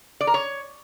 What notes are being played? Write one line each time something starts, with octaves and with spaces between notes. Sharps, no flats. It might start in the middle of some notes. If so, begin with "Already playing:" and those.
D5
A#4
C#5